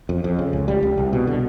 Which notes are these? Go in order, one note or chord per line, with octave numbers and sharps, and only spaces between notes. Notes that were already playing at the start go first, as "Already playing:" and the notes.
F2
F2
C#3
C#2
C#2 G3
C#2
C2
B2
B2 D3